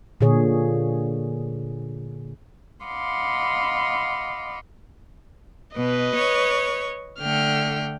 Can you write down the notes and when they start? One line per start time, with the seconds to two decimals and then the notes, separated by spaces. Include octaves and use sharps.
0.21 A#2 D3 G#4 C#5
2.85 D#5 F5 F#5 B5 C6 D6
5.77 B2 B4 D#5
6.16 C#5
7.21 D3 A3 G5 F6